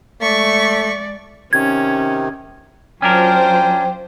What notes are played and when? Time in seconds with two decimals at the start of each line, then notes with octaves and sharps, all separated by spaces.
0.22 G#3 A3 D5 C#6 B6
1.53 C3 D#3 C#4 G#6
3.02 F#3 C#4 D4 F4 A#4 C5 G5